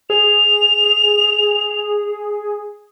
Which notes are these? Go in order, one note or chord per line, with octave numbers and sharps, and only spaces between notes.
G#4 F7